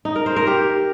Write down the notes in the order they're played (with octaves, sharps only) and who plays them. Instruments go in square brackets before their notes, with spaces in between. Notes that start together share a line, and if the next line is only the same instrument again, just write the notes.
[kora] D#4
A#4
C5
A#4
G4